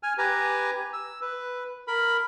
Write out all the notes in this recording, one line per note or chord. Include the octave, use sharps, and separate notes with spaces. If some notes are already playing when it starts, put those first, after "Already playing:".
G#5 F6
G4 B4 G#5 A#5
E6
B4
A#4 B5